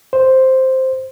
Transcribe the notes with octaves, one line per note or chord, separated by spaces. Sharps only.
C5